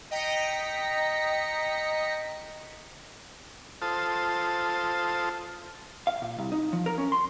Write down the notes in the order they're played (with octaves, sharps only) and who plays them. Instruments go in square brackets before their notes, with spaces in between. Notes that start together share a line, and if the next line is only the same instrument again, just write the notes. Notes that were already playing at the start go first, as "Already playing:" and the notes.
[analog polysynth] D#5 G5 A#5 A#6 B6 C#7
[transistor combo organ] F4 A4 C5 A5 D#6
[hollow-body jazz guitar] F5
A#2
C2
D#4
F3
A#4
C#4
C6